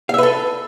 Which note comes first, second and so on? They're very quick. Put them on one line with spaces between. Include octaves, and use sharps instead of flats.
F5 E5 B4 A4